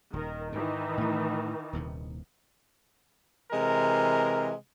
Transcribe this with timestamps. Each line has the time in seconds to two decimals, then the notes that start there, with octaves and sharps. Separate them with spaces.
0.13 D#1 D#3 A#4
0.52 G#2 D#3 E3 D#4
0.97 A2 A3
1.73 D#1 D#2 C3
3.52 C3 E3 G#3 A#4